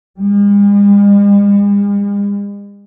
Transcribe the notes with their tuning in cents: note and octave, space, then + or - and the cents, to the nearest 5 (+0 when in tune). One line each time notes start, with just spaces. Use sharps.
G#3 -45